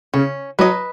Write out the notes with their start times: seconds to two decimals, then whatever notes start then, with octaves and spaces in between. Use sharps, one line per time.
0.14 C#3 C#4
0.59 F#3 B4 D#5